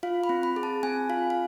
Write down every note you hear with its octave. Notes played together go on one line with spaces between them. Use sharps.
F4 F5
B5
C4
B5
G#4
A5
C4 G#5
F4 F5
F5